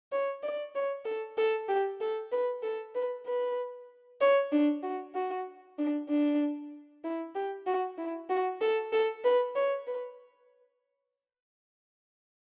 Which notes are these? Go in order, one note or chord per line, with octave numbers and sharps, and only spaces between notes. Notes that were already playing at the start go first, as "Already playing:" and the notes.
C#5
D5
C#5
A4
A4
G4
A4
B4
A4
B4
B4
C#5
D4
F#4
F#4
D4
D4
E4
G4
F#4
E4
F#4
A4
A4
B4
C#5
B4